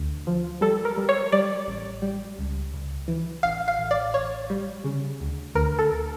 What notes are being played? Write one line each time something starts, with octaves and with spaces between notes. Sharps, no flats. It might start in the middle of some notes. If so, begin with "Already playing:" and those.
Already playing: D2
F3
G3 A4
A#4
G3
C#5
G3 D5
A1
G3
C#2
C#2
E3
A1 F5
F5
A1
D5
A1 C#5
G3
C#3
D2
D2 A#4
A4
D2